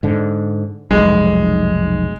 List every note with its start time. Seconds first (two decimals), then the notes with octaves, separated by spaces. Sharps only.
0.03 G#2 D3
0.91 F1 B1 G#3